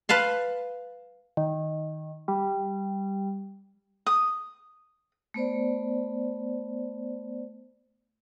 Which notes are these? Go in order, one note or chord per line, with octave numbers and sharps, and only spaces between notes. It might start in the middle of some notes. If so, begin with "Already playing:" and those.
B4 F5 A5 C6
D#3
G3
D#6
A3 B3 C5 D5